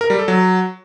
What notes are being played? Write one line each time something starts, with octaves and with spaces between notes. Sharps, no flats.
A#4
G3
A4
F#3